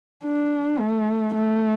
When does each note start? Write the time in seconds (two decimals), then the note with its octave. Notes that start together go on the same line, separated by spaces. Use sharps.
0.24 D4
0.79 A3
1.35 A3